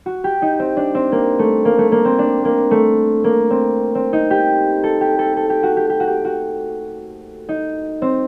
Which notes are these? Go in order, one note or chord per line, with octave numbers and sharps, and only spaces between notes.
F#4
G4
D#4
C4
D4
C4
A#3
A3
A#3
A3
A#3
C4
D4
A#3
A3
A#3
C4
C4
D#4
G4
A4
G4
A4
A4
G4
F#4
G4
G4
F#4
G4
F#4
D#4
C4